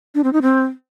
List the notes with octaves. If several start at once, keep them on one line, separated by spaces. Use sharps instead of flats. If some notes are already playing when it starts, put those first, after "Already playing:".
D4
C4
D#4
C4